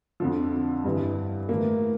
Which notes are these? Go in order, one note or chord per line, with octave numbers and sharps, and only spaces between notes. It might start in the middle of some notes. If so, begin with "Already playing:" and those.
F2 D3 F3
G2 E3
A2 E3 A#3